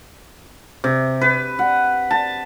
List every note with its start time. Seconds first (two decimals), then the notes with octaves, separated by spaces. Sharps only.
0.84 C3
1.21 B4
1.59 F#5
2.11 A5